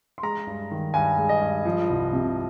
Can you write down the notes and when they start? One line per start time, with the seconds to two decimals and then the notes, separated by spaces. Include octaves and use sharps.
0.18 C6
0.23 G#3 A#5
0.47 G2
0.71 D#3
0.94 G2 G#5
1.18 G#3
1.29 D#5
1.41 G2
1.65 F3
1.90 C2
2.13 C3